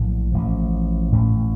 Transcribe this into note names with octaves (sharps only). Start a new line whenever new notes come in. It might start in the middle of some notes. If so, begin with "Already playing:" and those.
Already playing: A#1 A2 F#3
A1 A2 F3
A1 A2 A3 C#4